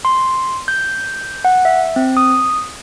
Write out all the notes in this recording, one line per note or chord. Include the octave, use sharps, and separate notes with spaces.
C6
G6
F#5
E5
C4
D#6